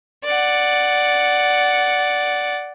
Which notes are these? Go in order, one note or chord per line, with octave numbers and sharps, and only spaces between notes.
D5 F#5